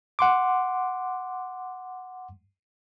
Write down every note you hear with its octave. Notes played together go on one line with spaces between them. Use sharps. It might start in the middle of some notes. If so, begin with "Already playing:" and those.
F#5 C6 D6